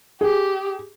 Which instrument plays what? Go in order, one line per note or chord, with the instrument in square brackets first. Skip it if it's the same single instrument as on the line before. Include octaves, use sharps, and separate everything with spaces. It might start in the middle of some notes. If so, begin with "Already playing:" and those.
[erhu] G4 [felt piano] G#4